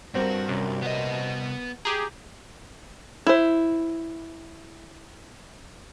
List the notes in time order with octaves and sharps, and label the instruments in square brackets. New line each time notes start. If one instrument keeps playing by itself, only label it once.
[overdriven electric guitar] G2 [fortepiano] C4 A#4 [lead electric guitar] F#4
[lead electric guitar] C2 [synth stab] F#2
[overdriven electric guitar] B3 D#5
[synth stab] G4 G#4 [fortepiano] A#5
[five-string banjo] E4 C5